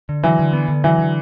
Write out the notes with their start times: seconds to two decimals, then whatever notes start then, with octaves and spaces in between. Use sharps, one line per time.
0.09 D3
0.23 E3 F#3
0.39 D3
0.53 B3
0.68 D3
0.84 E3 F#3
0.99 D3